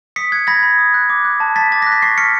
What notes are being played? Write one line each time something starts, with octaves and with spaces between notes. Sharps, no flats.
D#6 B6 C#7
F#6 G#6
B5 G#6 A#6
B5
D#6
F#6
D6
F#6
A5
A5 A6 B6
D6 A6
F#6 A#6
B6
C#6 A#6 C7
F6 B6 C#7